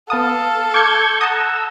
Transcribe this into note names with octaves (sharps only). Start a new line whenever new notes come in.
B3 A4 F5 A5 D#6
C#6 D6 G6 G#6 C#7
F#5 A5 A#5 D#6 E6